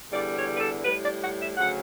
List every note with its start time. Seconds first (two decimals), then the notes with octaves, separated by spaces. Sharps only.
0.12 E2 D3 G3 D5
0.36 C#5
0.53 B4
0.60 A4
0.84 A2 G3 B4
1.03 D5
1.21 F#5
1.39 E5
1.57 D2 C#3 F#3 F#5